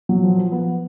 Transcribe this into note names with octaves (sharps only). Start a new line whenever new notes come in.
F#3
F3
F3
B3